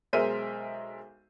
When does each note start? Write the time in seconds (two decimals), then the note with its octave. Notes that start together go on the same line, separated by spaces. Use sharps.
0.13 B1 G#3 A#4 C5 E5 D#7